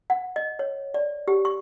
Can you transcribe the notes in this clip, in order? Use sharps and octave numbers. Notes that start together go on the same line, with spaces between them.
F#5
D#5
C#5
D5
G4
C#6